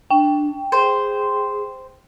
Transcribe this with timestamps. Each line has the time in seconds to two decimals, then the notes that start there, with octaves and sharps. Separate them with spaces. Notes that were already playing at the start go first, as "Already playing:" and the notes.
0.10 D4 G5
0.72 G#4 C5